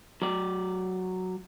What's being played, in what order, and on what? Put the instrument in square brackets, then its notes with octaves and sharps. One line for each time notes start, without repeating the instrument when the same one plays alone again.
[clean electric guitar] F#3 D5